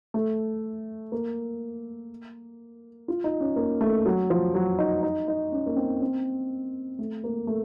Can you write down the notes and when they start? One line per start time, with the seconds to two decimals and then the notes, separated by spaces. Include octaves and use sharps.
0.14 A3
1.12 A#3
3.08 F4
3.24 D#4
3.40 C#4
3.56 A#3
3.81 A3
4.06 F#3
4.30 F3
4.54 F#3
4.79 D#4
5.03 D#4
5.28 D#4
5.52 C#4
5.66 A#3
5.76 C4
6.01 C4
6.99 A3
7.24 A#3
7.47 A3